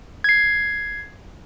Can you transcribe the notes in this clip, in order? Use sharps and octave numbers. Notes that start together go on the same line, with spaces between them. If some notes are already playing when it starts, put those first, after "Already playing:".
G#6 C7